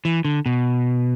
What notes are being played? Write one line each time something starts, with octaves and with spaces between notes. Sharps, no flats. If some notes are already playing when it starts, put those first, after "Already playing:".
E3
D3
B2